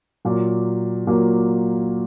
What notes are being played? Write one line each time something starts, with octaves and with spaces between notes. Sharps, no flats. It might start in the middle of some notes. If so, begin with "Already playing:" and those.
A#2 F#3 A#3
A#2 F#3 A#3